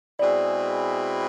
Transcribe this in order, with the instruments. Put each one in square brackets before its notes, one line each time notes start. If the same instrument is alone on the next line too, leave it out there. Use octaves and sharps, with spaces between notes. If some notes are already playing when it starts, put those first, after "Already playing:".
[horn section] B2 G#3 C4 E4 G#4 [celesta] D5